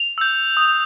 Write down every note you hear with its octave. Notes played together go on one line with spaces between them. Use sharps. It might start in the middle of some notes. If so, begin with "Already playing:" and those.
Already playing: F7
E6 G6
D#6